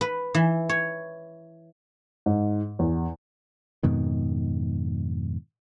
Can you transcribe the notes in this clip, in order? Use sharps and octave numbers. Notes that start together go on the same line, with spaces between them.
B4
E3
C#5
G#2
E2
F2 G#2 B2 D#3